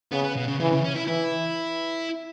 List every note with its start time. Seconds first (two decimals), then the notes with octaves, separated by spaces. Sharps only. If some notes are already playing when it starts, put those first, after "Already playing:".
0.12 C#3 B3
0.24 B3
0.37 B2
0.48 C#3
0.60 C#3 E3
0.72 C#3
0.84 C#4
0.95 E4
1.07 E3 E4